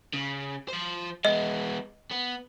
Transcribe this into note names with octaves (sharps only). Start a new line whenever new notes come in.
C#3
F3 C5
G#3 B3 D#5
B3